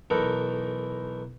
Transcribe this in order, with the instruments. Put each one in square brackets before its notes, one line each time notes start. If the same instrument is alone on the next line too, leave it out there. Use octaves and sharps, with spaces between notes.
[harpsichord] B1 E3 D#4 A4 A#4 F#5